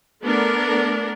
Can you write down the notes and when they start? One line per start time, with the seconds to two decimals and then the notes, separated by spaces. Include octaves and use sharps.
0.23 A3 B3 D4 A#4